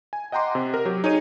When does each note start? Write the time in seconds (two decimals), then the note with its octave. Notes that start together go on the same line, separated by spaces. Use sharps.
0.13 G#5
0.32 D#5 F#5 G5 A#5 C6 D6
0.55 C3
0.74 A#4
0.85 F#3 G4
1.04 D#4 G#4 C#5 D#7